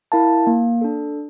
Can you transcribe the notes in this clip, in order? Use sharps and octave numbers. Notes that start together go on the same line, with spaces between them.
E4 A#4 F5 A5
A#3
D4 A4